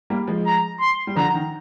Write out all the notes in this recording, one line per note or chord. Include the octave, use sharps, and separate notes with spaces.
G3 A#3
F3 G#3
A#5
C6
G3
D3 F3 A#5
D#3